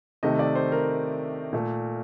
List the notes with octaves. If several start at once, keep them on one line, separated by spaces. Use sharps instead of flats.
C3 D#3 A3 D#5
D5
C5
A#4
A#2 A3